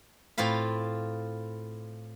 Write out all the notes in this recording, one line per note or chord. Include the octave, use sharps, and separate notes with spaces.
A2 C4 F4 F5 B5